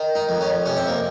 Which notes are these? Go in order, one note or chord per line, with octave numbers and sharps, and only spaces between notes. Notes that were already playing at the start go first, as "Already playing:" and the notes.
Already playing: D#3
D#4
F2
C#4
C3 C#4
C4
A#3